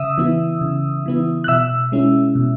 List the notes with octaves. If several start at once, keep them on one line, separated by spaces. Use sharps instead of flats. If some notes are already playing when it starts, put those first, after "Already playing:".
Already playing: C#3 E5 D#6 E6
E3 B3 E4
C#3
E3 B3 E4
F#6
B2 E5 E6
G#3 C#4 E4
B2